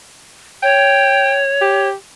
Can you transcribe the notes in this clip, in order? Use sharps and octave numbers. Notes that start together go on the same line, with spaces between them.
C#5 G5
G4